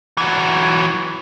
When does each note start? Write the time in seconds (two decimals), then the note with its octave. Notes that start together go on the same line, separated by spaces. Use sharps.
0.18 E3 F#3